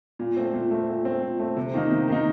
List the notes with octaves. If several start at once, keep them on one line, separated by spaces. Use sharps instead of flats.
A#2
A3 C4
A#2
A3 C4
A#2
A3 C4
A#2
A3 C4
C3
D#3 A#3 D#4
C3
D#3 A#3 D#4